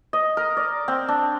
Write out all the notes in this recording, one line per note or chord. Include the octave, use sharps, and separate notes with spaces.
D#5
A#4
D5
C4
D4